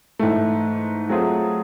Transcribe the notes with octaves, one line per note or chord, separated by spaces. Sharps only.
G#2 E3 A3
F#3 A3 C4 F4 G#4